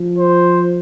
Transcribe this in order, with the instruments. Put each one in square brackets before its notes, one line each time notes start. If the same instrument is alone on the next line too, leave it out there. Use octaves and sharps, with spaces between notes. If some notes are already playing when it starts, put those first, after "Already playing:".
Already playing: [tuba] F3
[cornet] C5